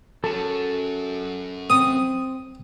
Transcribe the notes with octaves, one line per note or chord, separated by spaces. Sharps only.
F#3 C#4 A4 A5
C4 D#6